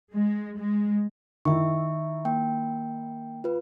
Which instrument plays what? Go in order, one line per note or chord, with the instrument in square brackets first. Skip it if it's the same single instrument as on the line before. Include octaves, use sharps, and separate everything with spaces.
[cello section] G#3
G#3
[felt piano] D#3 E4 [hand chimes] E5 C#6
[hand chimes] A#3 G5
F4 B4